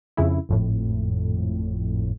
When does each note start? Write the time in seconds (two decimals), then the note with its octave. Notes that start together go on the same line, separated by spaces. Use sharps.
0.17 F2 C#3 E4
0.49 G#1 F2 A2